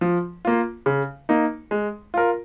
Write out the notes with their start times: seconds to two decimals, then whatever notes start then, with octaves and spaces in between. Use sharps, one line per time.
0.01 F3
0.45 A#3 F4
0.86 C#3
1.29 A#3 D#4
1.71 G#3
2.14 F4 A#4